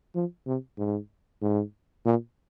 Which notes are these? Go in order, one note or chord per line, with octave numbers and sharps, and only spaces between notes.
F3
C3
G#2
G#2
A#2